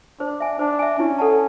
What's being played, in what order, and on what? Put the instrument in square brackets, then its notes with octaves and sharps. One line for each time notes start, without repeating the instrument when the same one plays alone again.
[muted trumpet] D4 [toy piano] C5
[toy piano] E5 G#5
[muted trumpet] D4 [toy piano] C5
[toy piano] E5 G#5
[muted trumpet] C#4 [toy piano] E4
[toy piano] A4 D5 F#5 A5